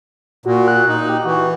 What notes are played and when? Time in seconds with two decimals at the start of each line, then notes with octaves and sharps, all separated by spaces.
0.46 A#2 F#4
0.68 F#6
0.89 D#4
1.09 G4
1.25 E3 F#4